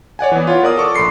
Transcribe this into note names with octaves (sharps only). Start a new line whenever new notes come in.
C#5 D5 F#5 G#5
E3 B3
F4 C#5 F#5
A#4 D5 D#6
A4 C#6 D6
A#1 B5 C6 C7 C#7